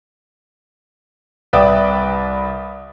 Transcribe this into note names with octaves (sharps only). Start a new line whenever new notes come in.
C2 B4 D5 E5 G5 D#6